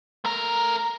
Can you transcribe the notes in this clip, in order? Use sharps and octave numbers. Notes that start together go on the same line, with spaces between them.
A3 A#4